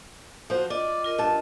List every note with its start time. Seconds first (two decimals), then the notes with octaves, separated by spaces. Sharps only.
0.50 F3 F#4 C5
0.70 F4 D5 D#5
1.04 F4 A#4 D#5
1.19 G2 A5